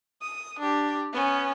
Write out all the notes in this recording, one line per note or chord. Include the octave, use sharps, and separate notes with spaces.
D#6
D4 G4
B3 C#4